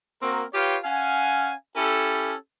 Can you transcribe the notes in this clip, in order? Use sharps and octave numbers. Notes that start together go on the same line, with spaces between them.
A#3 C4 F#4 A#4
F4 G4 B4 C#5 F5 G5
C#4 F5 F#5 G#5
C#4 E4 G4 A4